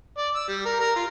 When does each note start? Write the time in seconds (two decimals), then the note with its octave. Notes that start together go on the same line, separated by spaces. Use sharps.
0.18 D5
0.36 E6
0.48 G3
0.65 A#4
0.80 A#4
0.96 F4